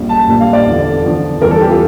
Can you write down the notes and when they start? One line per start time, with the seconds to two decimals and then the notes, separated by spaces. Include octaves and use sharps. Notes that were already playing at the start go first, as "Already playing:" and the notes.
Already playing: A#1 A#2 G3
0.09 A5
0.28 A#1 A#2 G3
0.40 F5
0.53 D5
0.66 E2 D3 F3
1.04 E2 D3 F3
1.42 E2 E3 G3 A#4
1.51 A4
1.61 G4
1.70 F4